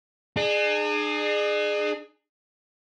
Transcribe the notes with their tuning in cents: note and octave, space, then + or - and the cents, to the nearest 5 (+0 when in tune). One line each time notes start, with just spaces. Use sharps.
D4 +45 G#4 +5